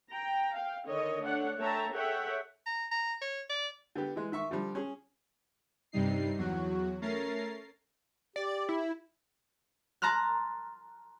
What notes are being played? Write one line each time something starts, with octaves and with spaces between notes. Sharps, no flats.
G5 A#5
F5 G5
D3 D#3 A4 C#5 D#5
A3 D4 C#5 F#5
A3 C#5 E5 G5 A5 A#5
G#4 A4 C#5 E5 F#5 G5
A#5
A#5
C#5
D5
D3 B3 G4
E3 G#3
D#3 E5 C#6
D3 F3 G3
C#4 G#4
G2 C3 G3 D#4 C7
E2 F#3 F#4
A3 C#4 A#4 A#5 A6 C7
G4 D5
E4
A5 A#5 C6 F6 F#6